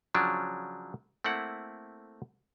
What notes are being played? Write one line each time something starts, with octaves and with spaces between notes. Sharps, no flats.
C#3 F3 F#3 C#4 D4
A3 A#3 C4 E4 F#5